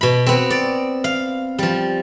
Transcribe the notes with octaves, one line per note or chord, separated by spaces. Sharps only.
B2 B5
B3 C4
D5
F5
F3 G3